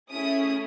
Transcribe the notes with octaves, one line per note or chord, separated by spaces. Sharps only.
A3 C#4 E4 G#4 D#6